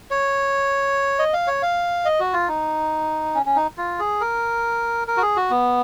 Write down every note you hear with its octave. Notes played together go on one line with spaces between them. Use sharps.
C#5
D#5
F5
C#5
F5
D#5
F#4
F4
D#4
C#4
C#4
D#4
F4
G#4
A#4
A#4
F#4
G#4
F#4
B3